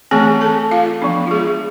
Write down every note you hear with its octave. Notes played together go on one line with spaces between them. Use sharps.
E3 A3 C4 G#4 G#5
A4 A5
F4 F5
F3 B3 D4
F4
G#3 G#4